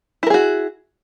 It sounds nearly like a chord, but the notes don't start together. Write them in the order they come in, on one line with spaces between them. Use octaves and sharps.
E4 A#4 G#4 F#4